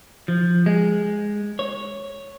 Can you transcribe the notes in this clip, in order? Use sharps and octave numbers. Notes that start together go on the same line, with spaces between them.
F3
G#3
C#5